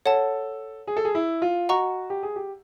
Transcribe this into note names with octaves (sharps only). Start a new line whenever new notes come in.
A4 C#5 F#5 A5
G#4
A4
G#4
E4
F4
F#4 D#5 F#5 A#5 C#6
G4
G#4
G4